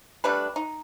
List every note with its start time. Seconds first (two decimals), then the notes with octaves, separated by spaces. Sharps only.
0.24 G3 A3 D4 B4
0.56 D#4